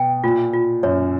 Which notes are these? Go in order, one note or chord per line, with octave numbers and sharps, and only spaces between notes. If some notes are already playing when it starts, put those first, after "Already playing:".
Already playing: B2 G5
A#2 F4
F4
F#2 C#5